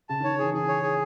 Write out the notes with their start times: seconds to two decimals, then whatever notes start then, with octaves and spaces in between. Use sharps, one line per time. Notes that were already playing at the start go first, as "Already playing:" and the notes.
0.09 C#3 A5
0.20 D#3
0.24 C#5
0.31 D#3
0.39 E3 G#4
0.54 E3 G#4
0.68 C#5
0.83 G#4